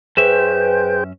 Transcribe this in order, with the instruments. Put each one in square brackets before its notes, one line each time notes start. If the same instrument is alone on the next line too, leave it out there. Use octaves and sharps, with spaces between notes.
[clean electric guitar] F#2 C#4 E5 [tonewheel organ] G#4 C5 G5 [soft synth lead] B4